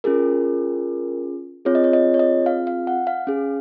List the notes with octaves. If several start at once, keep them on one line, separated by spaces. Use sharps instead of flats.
C#4 F4 G#4 A#4
C4 F4 G#4 C#5
D#5
C#5
D#5
C#5
D#5
F5
F5
F#5
F5
C#4 G#4